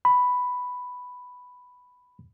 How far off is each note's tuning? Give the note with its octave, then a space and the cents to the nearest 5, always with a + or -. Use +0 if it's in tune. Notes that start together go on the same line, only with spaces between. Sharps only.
B5 +5